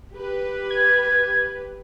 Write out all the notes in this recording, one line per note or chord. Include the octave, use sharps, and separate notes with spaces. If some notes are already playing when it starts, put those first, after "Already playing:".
G4 B4
G#6